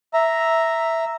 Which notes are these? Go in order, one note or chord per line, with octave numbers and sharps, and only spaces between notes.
E5 A#5